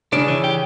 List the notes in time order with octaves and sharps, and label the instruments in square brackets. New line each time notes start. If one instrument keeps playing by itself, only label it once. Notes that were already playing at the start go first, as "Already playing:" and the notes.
[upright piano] C#3 C#4 [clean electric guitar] D4
[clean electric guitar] E3
G4